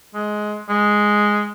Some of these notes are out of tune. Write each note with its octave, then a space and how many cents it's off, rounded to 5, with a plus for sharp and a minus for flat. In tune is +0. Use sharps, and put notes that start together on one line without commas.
G#3 +15
G#3 +0